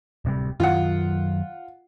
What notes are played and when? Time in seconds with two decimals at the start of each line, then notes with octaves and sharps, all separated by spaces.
0.25 D1 C3 G3
0.60 F#2 D#3 F#3 F4 F#5